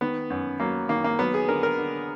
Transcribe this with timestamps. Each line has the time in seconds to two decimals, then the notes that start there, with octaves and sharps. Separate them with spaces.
0.01 D#3 B3
0.30 F#2
0.60 F#3 A#3
0.89 D#3 A#3
1.04 A#3
1.19 F#3 B3
1.34 G#4
1.49 D3 A#4
1.63 A#4
1.78 D3